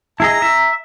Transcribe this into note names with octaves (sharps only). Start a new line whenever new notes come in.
E4 G#4 D#5 A#5
E5